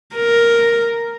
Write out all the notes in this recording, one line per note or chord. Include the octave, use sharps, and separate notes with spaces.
A#4